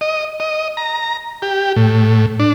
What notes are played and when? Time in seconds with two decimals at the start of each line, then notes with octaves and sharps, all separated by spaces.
0.01 D#5
0.40 D#5
0.77 A#5
1.42 G4
1.76 A2
2.40 D4